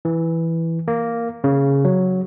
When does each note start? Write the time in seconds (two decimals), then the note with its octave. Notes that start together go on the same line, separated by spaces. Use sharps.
0.05 E3
0.88 A#3
1.44 C#3
1.85 F#3